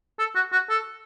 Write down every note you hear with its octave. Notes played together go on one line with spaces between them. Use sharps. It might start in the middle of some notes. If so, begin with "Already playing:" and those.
A4
F#4
F#4
A4